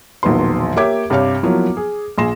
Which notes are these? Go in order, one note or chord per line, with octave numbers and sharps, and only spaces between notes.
E1 A#1 D#3 F#3 B4 C6
A#3 G4 C#5 E5 D6 G#6
G2 C3 G4 C#5 F5 F6
F3 F#3 A#3 B3 E4
G#4
A#1 G#4 C6 A#6 E7